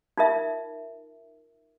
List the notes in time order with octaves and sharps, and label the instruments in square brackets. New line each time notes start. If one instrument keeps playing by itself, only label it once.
[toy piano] D#4 F4 A#4 E5